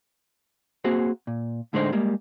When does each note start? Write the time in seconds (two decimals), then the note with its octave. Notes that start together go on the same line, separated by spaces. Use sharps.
0.84 A#3 C4 F#4 G#4 C5
1.27 A#2
1.73 A2 D3 G#3 D4 D#4 C5
1.92 G3 G#3 A#3